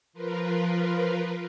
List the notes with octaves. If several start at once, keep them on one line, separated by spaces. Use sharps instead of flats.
F3 F4 A#4 B4